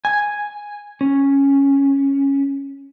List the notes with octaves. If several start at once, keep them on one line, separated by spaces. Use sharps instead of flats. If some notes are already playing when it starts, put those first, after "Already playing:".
G#5
C#4